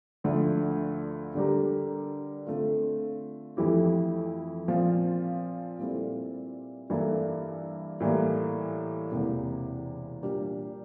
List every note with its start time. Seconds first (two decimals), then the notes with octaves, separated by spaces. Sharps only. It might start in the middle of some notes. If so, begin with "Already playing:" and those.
0.24 D2 D3 F3 A3
1.35 D3 G3 D4 G4 A#4
2.47 D3 A3 C4 F4
3.57 F2 E3 A3 E4 G4
4.68 A#2 F3 C4 F4
5.79 A#2 G3 C4 E4 A4
6.90 G2 E3 A#3 E4 A4
8.00 A2 E3 G3 A#3
9.11 E1 E2 C3 E3 A#3
10.22 A#2 G3 D4 G4 A#4